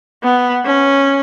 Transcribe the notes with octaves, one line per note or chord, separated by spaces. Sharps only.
B3
C#4